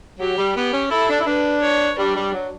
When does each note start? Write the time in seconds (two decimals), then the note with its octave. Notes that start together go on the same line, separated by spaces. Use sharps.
0.20 F#3 G4
0.38 G3
0.56 B3 G4
0.74 C#4
0.91 E4 A4
1.10 D4
1.21 E4
1.27 D4 B4
1.62 C#5
1.99 G3 D4
2.17 G3
2.34 F#3